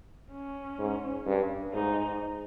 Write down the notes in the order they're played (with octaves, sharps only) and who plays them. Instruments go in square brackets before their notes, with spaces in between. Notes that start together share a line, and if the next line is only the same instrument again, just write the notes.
[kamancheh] C#4
[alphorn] G#2
G2
[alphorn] G#2 [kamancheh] D#4